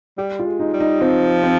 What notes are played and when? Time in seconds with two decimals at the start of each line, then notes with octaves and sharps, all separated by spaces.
0.18 G3 G4
0.39 F4
0.46 G#3
0.60 D#4
0.73 G3
0.80 D#4
1.01 F3 C4
1.43 C4